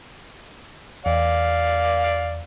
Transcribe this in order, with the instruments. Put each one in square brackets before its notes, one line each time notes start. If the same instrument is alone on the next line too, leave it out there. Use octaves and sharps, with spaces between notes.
[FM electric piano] E2 [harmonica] D5 F5